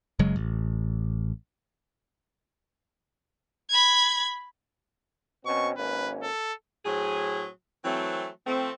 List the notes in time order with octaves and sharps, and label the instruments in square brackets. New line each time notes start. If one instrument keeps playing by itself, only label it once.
[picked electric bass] F#1 C#3 F#3 G#3
A1
[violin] B5 G#6
[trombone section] B2 C4 C#4 [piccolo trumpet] C#6
[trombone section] G#1 A#3 C#4 [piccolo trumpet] B4
[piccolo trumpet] A4
[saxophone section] A2 F#3 C4 G#4
E3 F#3 A3 C4
F3 A3 C4